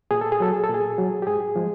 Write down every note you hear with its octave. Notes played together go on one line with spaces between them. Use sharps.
A#2 G#4
A4
G#4
F#3 A4
G#4
A4
A#2
G#4
F#3
G4
G#2 G#4
F3 G#3